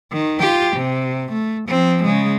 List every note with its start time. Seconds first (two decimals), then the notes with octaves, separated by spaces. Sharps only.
0.12 D#3
0.40 F4 G4
0.77 C3
1.32 A3
1.69 F3 C4
2.04 C#3 G#3